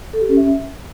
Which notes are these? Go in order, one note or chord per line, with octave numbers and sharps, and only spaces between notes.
A4
G4
C#4
E5